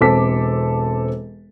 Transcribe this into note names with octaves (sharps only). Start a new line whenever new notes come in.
E1 C4 A4 D6 B6